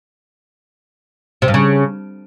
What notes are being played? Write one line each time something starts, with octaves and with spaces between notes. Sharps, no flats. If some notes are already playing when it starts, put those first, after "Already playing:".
C3
G2
C#3